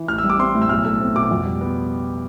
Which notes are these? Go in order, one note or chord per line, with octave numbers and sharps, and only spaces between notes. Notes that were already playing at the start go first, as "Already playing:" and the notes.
Already playing: E3
A1 F6
E6
G3
D6
C4 C6
A2
E6
B1 F6
A3 E6
C4
B2 D6
F2
G3
B3